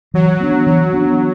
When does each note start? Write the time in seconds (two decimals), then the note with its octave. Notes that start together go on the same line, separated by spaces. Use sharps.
0.14 E3 F#3
0.40 B3 D4
0.66 E3 F#3
0.93 B3 D4